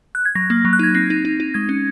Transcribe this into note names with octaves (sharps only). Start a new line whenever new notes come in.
F#6
G#6
F#3 A#6
A#3
F#3
F#6
D#4 G#6
C4 A#6
D#4
D#4
D#4
G#3 G#6
C#4